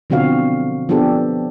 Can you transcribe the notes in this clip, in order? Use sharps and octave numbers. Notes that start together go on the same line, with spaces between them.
B2 D3 F3 C4 F#4 F5
F3 B3 D4 G4 A4